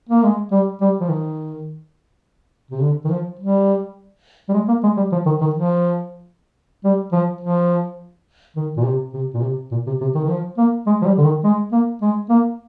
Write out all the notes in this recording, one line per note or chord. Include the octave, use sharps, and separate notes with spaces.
A#3
G#3
G3
G3
F3
D#3
C3
D3
D#3
F3
G3
G3
G#3
A#3
G#3
G3
F3
D#3
D#3
F3
G3
F3
F3
D#3
A#2
C3
C3
A#2
C3
A#2
C3
C3
D#3
D#3
F3
A#3
G#3
F3
G3
D3
D#3
G#3
A#3
G#3
A#3